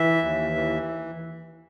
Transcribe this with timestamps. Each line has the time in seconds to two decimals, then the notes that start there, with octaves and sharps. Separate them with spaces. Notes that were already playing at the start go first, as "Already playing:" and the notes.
Already playing: E3 E5
0.23 D#2
0.56 E3